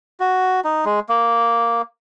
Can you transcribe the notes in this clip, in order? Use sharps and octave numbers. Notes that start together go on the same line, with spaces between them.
F#4
D#4
G#3
A#3